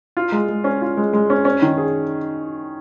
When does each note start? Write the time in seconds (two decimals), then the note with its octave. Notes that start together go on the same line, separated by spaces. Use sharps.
0.17 F4
0.32 G#3
0.49 G#3
0.64 C#4
0.81 F4
0.97 G#3
1.13 G#3
1.30 C#4
1.45 C#4
1.62 D#3
1.78 G#4